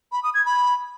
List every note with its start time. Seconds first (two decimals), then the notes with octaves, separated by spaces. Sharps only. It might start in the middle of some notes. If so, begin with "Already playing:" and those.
0.12 B5
0.23 D#6
0.34 G#6
0.45 B5